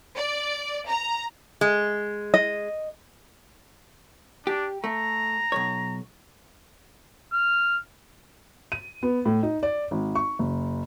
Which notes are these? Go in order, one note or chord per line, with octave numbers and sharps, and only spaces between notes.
D5
A#5
G#3
D#5
D4 G4
A3 A#5
B1 E2 C#5
F6
D#7
B3
A2
D#4
D5
G#1
C#6
F#1